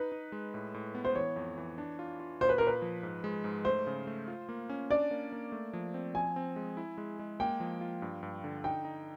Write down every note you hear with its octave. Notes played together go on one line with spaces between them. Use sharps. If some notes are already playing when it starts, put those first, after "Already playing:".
Already playing: D#4 B4
D#4
G#3
A2
A2
B3
C5
E3 C#5
F2
E3
D4
F4
F4
A#2 C5
B4
A#2 A#4
B4
F3
G#2
G#3
G#2
A3 C5
C#3
A3
F4
A#3
C#4
D4 D5
A#3
A#3
A3
F3
C4
F3 G#5
C4
G#3
E4
G#3
G#3
A#3 G5
F3
F4
G2
G2
D3
D#4 G5
D#4